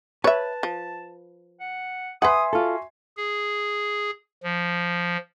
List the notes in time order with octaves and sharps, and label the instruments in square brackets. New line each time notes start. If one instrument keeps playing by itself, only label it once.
[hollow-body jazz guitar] B4 [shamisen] C#5 E5 [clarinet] A5
[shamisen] F3
[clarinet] F#5
[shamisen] B4 F#5 [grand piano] E5 G#5 C6 [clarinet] D#6
[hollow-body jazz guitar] F4 A4 [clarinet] F#4
[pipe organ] G#4
F3